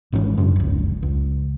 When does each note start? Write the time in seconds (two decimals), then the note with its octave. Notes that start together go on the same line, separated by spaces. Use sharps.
0.12 G#1 G#2 E3 C#4
0.38 F#2 C#3 D4
0.56 F1 C#2
1.03 C#2